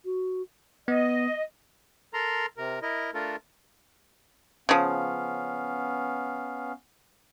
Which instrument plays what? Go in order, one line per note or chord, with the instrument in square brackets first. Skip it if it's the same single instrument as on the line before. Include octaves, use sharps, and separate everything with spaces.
[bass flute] F#4
[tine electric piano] B3 [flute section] D#5
[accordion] A4 A#4 A#5 C6
C3 A#4
E4 A#4 D#5
A3 D4 F4 A4 A#4
[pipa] C#3 F3 [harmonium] B3 C#4 F5